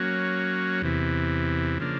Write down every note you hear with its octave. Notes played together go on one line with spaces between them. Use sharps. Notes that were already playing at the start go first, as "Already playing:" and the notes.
Already playing: F#3 A#3 C#4 F#4
E2 C3 E3
C#3 F3 A#3 D4